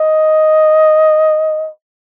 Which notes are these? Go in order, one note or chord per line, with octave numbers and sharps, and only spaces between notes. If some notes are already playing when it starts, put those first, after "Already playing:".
Already playing: D#5